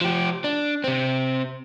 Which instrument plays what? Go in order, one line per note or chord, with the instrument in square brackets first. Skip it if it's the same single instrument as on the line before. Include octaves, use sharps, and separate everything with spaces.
[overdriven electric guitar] F3 G4
D4
C3 C4